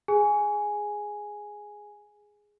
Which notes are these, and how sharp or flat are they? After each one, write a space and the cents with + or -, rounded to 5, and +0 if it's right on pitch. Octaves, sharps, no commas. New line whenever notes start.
G#4 +0 G#5 +0